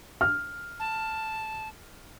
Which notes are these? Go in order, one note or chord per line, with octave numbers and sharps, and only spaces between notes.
F6
A5